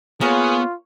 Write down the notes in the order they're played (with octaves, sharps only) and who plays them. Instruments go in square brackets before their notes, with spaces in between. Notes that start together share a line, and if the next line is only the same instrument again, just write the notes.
[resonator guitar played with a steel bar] A#3 C#5 [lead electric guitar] B3 [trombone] F4 [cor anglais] G#4